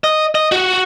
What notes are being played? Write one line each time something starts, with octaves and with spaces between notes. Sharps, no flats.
D#5
D#5
F#4